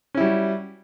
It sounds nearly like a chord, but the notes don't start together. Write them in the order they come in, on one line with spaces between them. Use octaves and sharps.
C#4 E4 G3 F#4